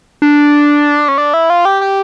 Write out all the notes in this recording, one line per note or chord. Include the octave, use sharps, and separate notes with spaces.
D4
C#4
D4
E4
F4
G4
G4